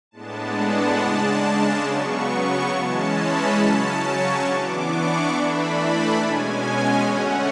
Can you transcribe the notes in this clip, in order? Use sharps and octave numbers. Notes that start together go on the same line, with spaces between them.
A2 G#3 B3 D4 A5
F#5
C#3 G#3 D4 A5
C#3 F#3 B3 C#6
C#6
E3 G#3 C#4 A5
B5
C#3 F#3 C#4 A5
C#6
E3 B3 D4 D6
C#6
E3 A3 D4 B5
A5
B2 G#3 C#4 G#5
D3 A3 C#4 F#5